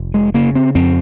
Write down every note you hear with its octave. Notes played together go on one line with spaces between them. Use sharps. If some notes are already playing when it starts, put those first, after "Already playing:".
Already playing: F1
G#3
C#3 A#3
C4
F2 C4